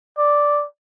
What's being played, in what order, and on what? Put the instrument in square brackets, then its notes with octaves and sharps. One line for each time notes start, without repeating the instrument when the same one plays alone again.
[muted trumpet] D5